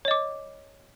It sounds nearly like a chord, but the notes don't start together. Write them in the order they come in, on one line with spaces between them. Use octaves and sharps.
C#5 D#5 D6